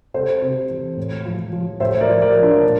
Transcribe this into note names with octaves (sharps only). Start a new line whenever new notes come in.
C3 A4 C5
C3
E3
A2
F3
F3
A2 C5 E5
A#4 D5
F3
A#4 D5
F3
D4 F4
A#2